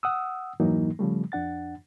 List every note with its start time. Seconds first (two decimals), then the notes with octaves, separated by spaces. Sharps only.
0.03 F#5 D#6 E6
0.60 F2 G#2 E3 F#3 A#3 D#4
0.99 C#3 F3 G3 A3
1.32 F2 D4 F#5 A6